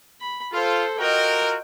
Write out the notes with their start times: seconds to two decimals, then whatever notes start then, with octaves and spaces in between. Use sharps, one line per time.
0.21 B5
0.53 F4 A4 C5
1.00 F4 F#4 A#4 D#5 G5